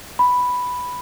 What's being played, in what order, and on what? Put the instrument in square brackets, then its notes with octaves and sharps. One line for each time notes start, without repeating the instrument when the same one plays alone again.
[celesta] B5